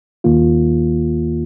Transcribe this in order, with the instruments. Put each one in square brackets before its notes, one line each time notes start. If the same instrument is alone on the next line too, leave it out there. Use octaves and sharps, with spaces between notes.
[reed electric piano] D#2 D#3 A#3 F4